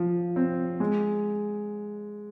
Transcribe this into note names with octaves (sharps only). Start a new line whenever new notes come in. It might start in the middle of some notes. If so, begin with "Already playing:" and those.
Already playing: F3
C4
G#3